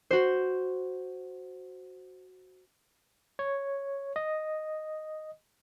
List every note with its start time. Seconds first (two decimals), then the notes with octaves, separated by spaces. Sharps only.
0.11 F#4 C5
3.39 C#5
4.16 D#5